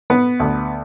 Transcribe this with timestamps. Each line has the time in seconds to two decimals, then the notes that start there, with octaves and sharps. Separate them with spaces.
0.10 B3
0.40 D2